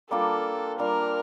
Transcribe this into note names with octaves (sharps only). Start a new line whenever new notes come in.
G3 A#3 D4 F4 A4
G3 A#3 D4 F4 A#4